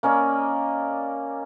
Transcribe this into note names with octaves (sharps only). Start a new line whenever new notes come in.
A#3 C#4 D5 D#5